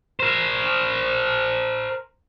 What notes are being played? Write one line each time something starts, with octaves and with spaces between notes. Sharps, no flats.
A#4 C5